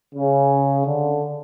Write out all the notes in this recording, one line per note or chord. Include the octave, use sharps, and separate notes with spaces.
C#3
D3